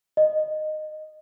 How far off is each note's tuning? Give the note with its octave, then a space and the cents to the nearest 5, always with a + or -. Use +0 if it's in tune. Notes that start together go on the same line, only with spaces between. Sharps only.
D#5 -15